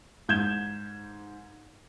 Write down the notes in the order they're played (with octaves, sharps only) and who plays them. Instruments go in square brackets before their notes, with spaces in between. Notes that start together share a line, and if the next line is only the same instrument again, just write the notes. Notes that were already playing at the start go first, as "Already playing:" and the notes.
[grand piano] G#2 G6 G#6 E7